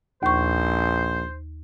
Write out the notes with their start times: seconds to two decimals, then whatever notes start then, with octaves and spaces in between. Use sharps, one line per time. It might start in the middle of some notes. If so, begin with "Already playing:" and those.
0.23 A#1 D#2 C5 C#6